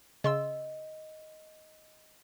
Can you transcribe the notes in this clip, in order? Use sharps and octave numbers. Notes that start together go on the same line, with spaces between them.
C#3 D#5 C6 E6